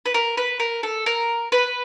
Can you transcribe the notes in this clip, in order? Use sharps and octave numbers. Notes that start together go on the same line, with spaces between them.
B4
A#4
B4
A#4
A4
A#4
B4